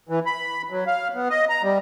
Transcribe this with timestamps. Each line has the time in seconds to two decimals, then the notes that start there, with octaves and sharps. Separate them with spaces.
0.09 E3
0.26 B5
0.70 F#3
0.87 F5
1.15 B3
1.30 D#5
1.49 A#5
1.63 G3